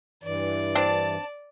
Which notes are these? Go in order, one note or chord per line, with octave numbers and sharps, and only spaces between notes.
G2 E3 D5
C4 D4 A5